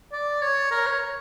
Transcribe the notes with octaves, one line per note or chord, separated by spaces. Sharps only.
D5
C#5
A#4
C#5